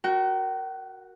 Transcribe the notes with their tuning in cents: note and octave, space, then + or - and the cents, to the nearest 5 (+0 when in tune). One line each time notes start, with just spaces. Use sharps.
F#4 +0 A#4 +0 G5 -40